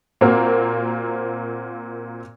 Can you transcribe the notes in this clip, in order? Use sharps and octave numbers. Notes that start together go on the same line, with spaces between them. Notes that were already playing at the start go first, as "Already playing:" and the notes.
A#2 A#3 C4 F#4 A#4